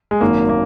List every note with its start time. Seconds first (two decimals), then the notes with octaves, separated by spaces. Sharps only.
0.11 G#3
0.21 G#1 F#2 D#3 F#3 A#3
0.49 A#3